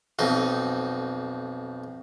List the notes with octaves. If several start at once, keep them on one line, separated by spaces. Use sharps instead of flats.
B1 F2 D#4